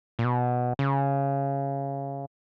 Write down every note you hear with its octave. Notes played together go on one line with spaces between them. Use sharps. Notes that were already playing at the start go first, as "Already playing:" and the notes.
A#2
B2
C#3